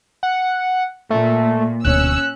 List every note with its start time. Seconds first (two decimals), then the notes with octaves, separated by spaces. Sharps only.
0.23 F#5
1.10 A#2 A3
1.85 D1 D2 B2 C#4 E6 F#6